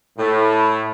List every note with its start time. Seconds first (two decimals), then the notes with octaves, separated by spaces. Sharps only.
0.18 A2